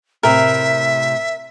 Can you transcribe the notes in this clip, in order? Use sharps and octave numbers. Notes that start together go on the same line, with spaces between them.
A2 C3 A#4 E5